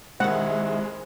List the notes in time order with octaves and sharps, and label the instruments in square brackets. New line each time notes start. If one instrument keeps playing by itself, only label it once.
[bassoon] C3 [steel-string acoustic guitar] D#3 E4 [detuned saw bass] G#3 [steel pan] F#5